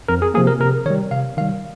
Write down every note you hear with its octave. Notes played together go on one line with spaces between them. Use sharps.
F2 A#4
G#4
C3 F3 A#3 G#4
A#4
C3 A#4
D#3 G3 C#5
C3 F5
D#3 G3 F5